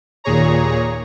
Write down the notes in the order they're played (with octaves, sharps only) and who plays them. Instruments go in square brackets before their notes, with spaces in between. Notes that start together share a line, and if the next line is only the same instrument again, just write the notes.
[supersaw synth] D#2 A#2 G#4 C#5 A#5